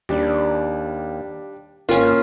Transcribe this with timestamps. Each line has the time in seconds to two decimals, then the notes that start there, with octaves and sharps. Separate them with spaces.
0.09 D#2 G3 D4
1.89 G#1 A#3 C#4 F4